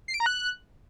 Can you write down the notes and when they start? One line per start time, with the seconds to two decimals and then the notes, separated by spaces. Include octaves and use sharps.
0.08 C7
0.14 D7
0.20 A#5
0.26 F#6